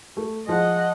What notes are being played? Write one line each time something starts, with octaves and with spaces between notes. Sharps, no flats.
A3
F3 G#3 D#5 F#5